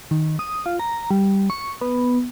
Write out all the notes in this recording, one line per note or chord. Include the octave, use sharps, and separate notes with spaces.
D#3
D#6
F4
A#5
G3
C#6
B3